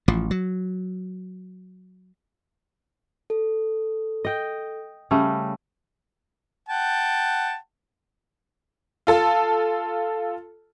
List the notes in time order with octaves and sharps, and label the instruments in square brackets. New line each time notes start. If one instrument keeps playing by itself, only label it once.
[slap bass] A1 F3
F#3
[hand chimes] A4
[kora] D#5 G5
C#3 G3 A3
[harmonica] F#5 G5 A5
[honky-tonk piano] F4 A4 A5